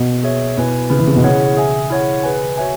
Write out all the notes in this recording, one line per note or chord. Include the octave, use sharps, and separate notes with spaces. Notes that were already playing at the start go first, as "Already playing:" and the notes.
Already playing: B2
G#4 C#5 E5
B2 E4 B4 G#5
C#3 E4 G#4 B4
E3
C#3
B2
C#3 E4 G#4 C#5 F#5
G#4 E5 G#5
E4 C#5 F#5
G#4 B4 G#5
F#4 C#5 E5 G#5